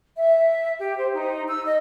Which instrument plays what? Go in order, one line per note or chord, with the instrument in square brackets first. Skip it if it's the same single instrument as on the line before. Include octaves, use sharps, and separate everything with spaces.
[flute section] E5
G4
C5
D#4
E6
D#5